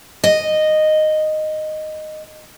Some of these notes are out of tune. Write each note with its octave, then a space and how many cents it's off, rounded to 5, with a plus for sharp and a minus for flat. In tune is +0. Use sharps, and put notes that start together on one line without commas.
D#5 -10